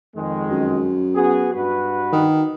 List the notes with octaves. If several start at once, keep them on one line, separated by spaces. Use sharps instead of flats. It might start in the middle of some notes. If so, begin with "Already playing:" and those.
F2 D#3 G#3
F#2
B3 F#4 G#4
G2 F#4 B4
D#3